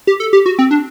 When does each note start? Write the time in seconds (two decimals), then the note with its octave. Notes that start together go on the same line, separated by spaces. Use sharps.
0.07 G4
0.20 A4
0.33 G4
0.46 F#4
0.59 C4
0.71 D4